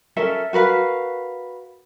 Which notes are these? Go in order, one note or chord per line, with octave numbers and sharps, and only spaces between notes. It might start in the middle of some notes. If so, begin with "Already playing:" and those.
C#4 A4 A#4 E5
F#4 A#4 B4 F5